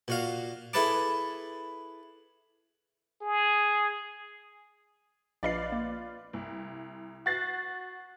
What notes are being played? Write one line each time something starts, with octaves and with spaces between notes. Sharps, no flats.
A#2 F#4 F5
E4 G#4 A4 B4 A5 D6
G#4
A#1 F4 B4 D5 D#5 C7
A#3
C2
F#4 A6 C7